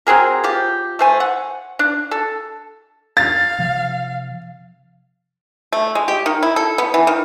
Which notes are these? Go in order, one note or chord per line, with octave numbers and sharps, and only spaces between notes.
F#3 C4 G#4 A#4
F3 G4
A3 C5 G#5
F#5
D4
A4
F5 A6
C3 F3
A3
G#3
G4
D#3
E4
A4
B3
E3
D#3